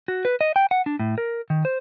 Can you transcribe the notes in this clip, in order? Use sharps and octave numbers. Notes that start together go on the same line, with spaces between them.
F#4
B4
D#5
G5
F#5
D4
A2
A#4
D#3
C5